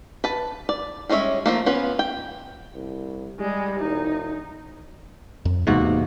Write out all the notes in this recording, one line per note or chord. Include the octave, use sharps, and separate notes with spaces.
B4 A5
D5
G3 G#3 C#4 C#5 E5
F3 A3 A#3
B3 C#4 F4 B4
G5
C2
G3 G#3
E1 D#4
F2
D1 E2 G#2 C3 A#3 F#4